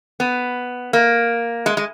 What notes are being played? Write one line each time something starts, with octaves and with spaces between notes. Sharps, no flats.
B3
A#3
G#3
G#3